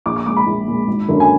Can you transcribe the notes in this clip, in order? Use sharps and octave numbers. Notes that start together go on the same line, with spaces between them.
A#1 D6
D6
A#2 G#3 D6
B5
A#1
A#2 G#3
G#1
F#2 D3 F#3 A#3
G#5